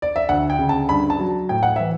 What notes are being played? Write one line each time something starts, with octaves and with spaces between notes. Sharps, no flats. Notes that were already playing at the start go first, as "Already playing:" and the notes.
D5
E5
D2 F#5
G5
C#3
A5
G2 B5
A5
F#3
A2 G5
F#5
E3 E5